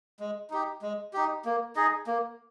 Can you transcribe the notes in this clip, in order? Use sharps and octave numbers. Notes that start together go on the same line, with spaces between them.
G#3
D#4 G4
G#3
D#4 G4
A#3
D#4 G#4 D#5
A#3